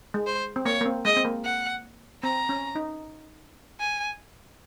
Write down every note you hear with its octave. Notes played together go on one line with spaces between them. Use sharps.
G#3
C5
C4
A#3 C#5
A#3
C4
G#3 D#5
C4
A#3
F#5
C4 A#5
C#4
D#4
G#5